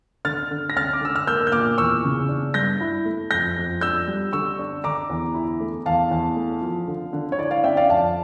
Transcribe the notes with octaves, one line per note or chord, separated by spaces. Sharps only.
D3 F6 A6
D3
A#6
C#4 F6 A6
D6
D3 E6
F6
A#3 E6 G6
G6
A#2 D6 F6
E2 C#6 E6
C#3
D4
G2 G6 A#6
E4
A3
F2 G6 A#6
F2
D4 E6 G6
G3
D3 C#6 E6
D4
D3 A#5 D6
E2
E4
A3
E2 F5 A5
E2
A3
F3
D3
D3
C#5
E4 D5
D5 F5
C#4 E5 G5
D5 F5
F2 F5 A5